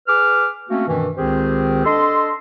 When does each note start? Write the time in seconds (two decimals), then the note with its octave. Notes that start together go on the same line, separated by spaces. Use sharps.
0.06 G#4 B4 D6 F6
0.69 A3 A#3 C4 C#4 F#4
0.87 G2 B2 D#3 E3
1.17 C#2 D#3 C4 G4 G#4 C5
1.85 D4 A4 D#5 C6